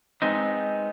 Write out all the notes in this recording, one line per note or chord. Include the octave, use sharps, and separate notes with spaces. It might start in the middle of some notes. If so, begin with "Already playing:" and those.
G#3 B3 C4 D#4